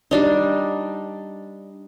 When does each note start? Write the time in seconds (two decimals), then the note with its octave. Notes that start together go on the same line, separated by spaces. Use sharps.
0.11 G3 D4 D#4